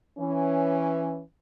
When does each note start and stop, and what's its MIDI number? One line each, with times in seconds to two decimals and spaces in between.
0.18 1.20 52
0.18 1.20 61